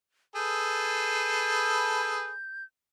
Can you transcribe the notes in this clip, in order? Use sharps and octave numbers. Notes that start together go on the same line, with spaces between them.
G#4 A4 B4 G6